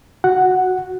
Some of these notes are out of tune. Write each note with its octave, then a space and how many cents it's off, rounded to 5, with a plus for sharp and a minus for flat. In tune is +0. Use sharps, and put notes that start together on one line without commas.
F#4 +0 F#5 +0